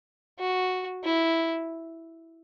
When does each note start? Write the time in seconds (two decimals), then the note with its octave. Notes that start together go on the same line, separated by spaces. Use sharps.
0.39 F#4
1.04 E4